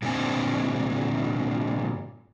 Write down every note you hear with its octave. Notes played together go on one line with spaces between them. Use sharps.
G2 A#2 D3 C4 G#5